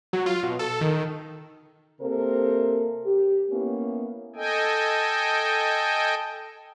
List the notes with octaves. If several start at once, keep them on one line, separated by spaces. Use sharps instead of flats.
F#3
F4
B2
A4
D#3
C3 A#3 A4 A#4 C5
G4
A#3 B3 C#4 E4
A4 D#5 G5 G#5